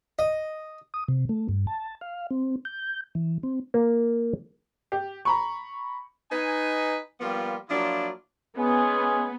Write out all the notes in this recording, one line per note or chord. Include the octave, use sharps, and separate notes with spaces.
D#5
D#6
C3
A3
G2
A5
F5
C4
G6
E3
C4
A#3
G4
A#5 B5 C#6
D#4 B4 G#5
F3 G3 A#3 B3 F4
F3 F#3 A#3 D4 E4 F4
G#3 B3 C#4 G#4